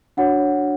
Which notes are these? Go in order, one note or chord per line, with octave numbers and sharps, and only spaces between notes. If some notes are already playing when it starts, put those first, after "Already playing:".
D4 F#4 C#5 F#5